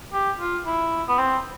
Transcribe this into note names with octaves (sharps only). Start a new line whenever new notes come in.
G4
F4
E4
B3
C4